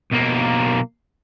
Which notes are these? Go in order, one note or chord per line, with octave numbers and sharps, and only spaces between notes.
B1 A#3